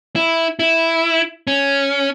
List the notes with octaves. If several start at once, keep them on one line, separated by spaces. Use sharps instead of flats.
E4
E4
C#4